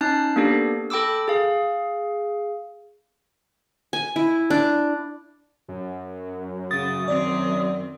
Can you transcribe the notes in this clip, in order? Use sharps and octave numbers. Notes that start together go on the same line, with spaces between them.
C#4 D#4 A5 F#6 C7
A#3 B3 D4 G4 A4
A4 G5 B5 D6 E6
G#4 F5
G#5
E4
D4
F#2
C#3 D#6 A6
D#3 C4 D5